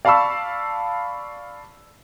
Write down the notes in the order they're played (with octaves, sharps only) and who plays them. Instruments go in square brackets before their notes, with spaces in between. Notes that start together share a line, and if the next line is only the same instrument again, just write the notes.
[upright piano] D5 F5 A5 B5 C#6 E6